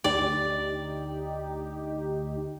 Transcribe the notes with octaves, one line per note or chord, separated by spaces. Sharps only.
D2 D#4 G4 D5